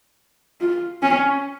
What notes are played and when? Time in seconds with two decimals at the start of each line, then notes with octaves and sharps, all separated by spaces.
0.61 F4
1.03 C#4